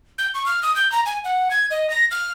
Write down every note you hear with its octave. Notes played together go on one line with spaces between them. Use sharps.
G6
C#6
F6
D#6
G6
A#5
G#5
F#5
G#6
D#5
A#6
F6